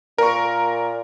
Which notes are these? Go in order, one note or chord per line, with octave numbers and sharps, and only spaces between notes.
A#2 A#4 C#6